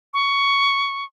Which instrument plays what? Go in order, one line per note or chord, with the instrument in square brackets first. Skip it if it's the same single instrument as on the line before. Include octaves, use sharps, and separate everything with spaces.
[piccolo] C#6